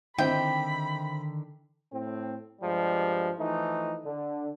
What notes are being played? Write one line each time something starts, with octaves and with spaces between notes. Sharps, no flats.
D3 D#3 C4 D#4 E4 G5 B5
A2 C4
G2 F3 G3 G#3
E3 F3 A3 D#4
D3